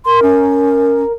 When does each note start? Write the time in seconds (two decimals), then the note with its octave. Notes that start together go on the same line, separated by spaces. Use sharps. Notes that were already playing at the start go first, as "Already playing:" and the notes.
0.05 A#4 C6
0.23 C#4